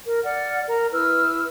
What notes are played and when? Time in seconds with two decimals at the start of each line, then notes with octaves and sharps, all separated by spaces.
0.06 A#4
0.24 D5 F#5 F6
0.67 A#4 A#5
0.93 E4 B4 E6 F6